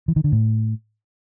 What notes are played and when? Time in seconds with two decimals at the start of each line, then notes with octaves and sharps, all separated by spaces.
0.08 E3
0.16 D#3
0.24 D3
0.32 A2